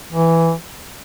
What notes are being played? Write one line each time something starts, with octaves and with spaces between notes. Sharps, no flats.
E3